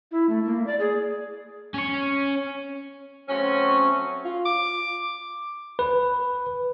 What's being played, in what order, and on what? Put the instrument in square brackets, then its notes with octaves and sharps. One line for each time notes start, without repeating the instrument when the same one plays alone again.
[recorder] E4
A3
A#3
D5
G#4
[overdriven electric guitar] C#4 C#5
[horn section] F#3 A3 C4 C#4
[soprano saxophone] F4
D6
[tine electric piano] B4